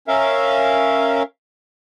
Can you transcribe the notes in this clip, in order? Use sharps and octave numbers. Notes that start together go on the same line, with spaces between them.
C#4 A#4 E5 F5